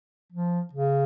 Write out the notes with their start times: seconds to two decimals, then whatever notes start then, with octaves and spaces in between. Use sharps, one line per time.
0.32 F3
0.73 C#3